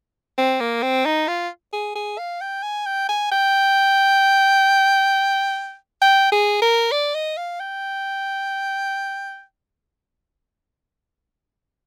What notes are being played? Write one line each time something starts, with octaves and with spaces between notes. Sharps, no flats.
C4
A#3
C4
D#4
F4
G#4
G#4
F5
G5
G#5
G5
G#5
G5
G5
G#4
A#4
D5
D#5
F5
G5